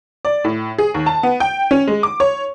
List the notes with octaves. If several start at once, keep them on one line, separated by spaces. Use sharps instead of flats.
D5
A2
G#4
D#2
A5
B3
G5
C#4
G#3
D6
C#5